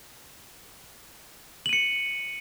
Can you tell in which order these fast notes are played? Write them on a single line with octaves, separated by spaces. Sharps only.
F#7 D#7 C#7